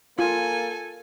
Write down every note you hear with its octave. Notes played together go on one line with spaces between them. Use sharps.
A#3 F4 A4 G#5